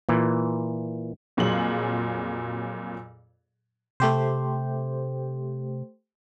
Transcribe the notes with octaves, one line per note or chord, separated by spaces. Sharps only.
A#2 E3
F2 A#2 F#3 F4 G#4 F#7
C3 A3 G4 C5